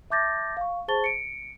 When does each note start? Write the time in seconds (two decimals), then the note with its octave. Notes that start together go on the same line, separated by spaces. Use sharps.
0.10 E5 A5 D6 G6 A6 A#6
0.57 F5 C#6
0.88 G#4 C5 A5 C#6 A6 G7
1.04 C#7 D7